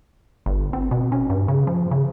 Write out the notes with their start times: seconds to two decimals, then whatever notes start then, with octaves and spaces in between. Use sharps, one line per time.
0.46 G1
0.73 C4
0.91 B2
1.12 C#4
1.30 G2
1.48 C#3
1.67 F3
1.91 C#3